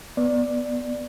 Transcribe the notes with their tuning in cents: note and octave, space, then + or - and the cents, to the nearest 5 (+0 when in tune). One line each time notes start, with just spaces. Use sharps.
B3 +0 D5 +0